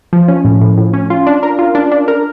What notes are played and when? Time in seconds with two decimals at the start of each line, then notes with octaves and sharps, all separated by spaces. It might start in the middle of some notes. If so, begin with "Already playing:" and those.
0.13 F3
0.28 C#4
0.45 A2
0.61 A2
0.78 A2
0.93 C#4
1.10 F4
1.27 D4
1.43 A#4
1.59 F4
1.75 D4
1.92 D4
2.08 A#4